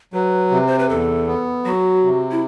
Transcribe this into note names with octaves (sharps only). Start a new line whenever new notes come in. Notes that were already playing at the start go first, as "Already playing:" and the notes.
F#3 B4
C3
C5
B4
E2 A4
B3
F#3 F#4
C3
E4